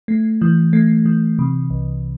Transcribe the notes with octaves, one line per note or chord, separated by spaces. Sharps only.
A3
E3
A3
E3
C3
C2